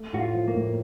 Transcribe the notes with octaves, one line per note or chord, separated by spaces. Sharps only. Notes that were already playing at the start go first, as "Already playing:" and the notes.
Already playing: A3
A2 F#4
F4
F3
A#3
A2